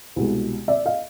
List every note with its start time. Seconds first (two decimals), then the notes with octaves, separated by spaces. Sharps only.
0.16 C2 B2 G#3
0.68 D5 E5
0.86 D#5 F5